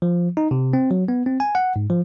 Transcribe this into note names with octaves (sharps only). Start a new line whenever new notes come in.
F3
D#4
C3
C4
F#3
B3
C4
G#5
F#5
G#2
F3